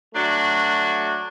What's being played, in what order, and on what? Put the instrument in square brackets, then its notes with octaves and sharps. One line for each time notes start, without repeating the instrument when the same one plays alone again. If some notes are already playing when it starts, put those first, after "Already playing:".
[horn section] F#3 A3 D4 F#4